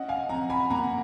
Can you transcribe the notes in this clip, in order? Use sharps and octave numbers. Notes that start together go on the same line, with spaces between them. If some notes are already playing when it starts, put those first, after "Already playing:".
Already playing: C#4 D#5 F#5
F5 G#5
F2 F#5 A#5
G#5 B5
A#3 F#5 A#5